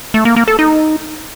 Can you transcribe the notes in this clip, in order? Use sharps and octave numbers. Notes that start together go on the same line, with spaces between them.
A3
A#3
A#3
A4
D#4